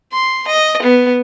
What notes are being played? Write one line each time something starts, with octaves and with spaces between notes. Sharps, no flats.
C6
D#5
B3